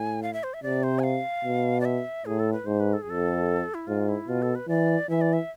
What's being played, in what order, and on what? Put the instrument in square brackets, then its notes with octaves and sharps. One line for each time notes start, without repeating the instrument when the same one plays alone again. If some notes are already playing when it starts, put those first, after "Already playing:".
Already playing: [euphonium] A2 [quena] G#5
[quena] F5
E5
C5
E5
[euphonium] C3 [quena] D5
[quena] C5
G#5
F5
[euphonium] B2
[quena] D5
E5
[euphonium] A2 [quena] G#4
[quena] A4
B4
[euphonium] G#2 [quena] C5
[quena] B4
A4
G#4
[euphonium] F2 [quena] A4
[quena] E4
[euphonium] G#2 [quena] F4
[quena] E4
[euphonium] B2 [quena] F4
[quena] A4
B4
[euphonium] E3 [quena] D5
[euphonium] E3 [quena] E5
[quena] D5
E5